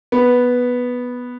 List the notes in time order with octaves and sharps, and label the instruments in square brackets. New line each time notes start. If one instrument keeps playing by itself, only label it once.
[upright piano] B3